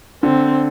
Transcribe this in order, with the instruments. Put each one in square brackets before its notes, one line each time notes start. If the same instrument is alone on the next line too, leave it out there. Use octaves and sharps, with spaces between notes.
[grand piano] D3 [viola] C4